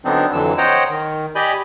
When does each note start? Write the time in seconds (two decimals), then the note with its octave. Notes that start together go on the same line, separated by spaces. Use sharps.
0.05 D3 F#3 B3 C4 D4 D#4
0.33 F2 D3 E3 F#3 E6
0.58 C5 C#5 D#5 F#5 G5 A#5
0.90 D#3
1.35 G4 D5 D#5 G#5 B5 G6